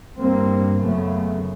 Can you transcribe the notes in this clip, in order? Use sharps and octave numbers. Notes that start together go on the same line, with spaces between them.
G2 A#3 C4
F#2 C#3 A3 B3